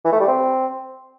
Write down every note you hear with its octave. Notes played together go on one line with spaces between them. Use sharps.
E3
A3
G3
C4